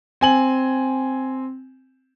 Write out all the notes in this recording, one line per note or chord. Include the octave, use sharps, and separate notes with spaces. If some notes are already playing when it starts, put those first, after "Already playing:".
C4 G#5 F#7